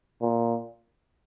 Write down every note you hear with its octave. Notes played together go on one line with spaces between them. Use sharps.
A#2